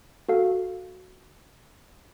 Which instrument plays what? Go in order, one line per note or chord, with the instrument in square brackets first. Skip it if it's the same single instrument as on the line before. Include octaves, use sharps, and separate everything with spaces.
[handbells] F#4 A4 F5